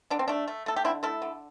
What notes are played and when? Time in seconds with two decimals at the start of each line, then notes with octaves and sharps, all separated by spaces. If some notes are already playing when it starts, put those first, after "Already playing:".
0.10 D3 D4
0.19 C4
0.28 A3 D4
0.48 A3
0.66 A3 A4
0.76 G4
0.85 D3 C4 E4
1.03 A3 E4 A4
1.22 D3